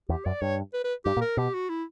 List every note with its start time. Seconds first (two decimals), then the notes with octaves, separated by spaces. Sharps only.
0.09 E2 G4
0.26 F#2 D5
0.42 G2 C#5
0.74 B4
0.85 B4
1.05 G2 G4
1.17 A#2
1.21 A#4
1.37 B2 G4
1.54 F#4
1.69 E4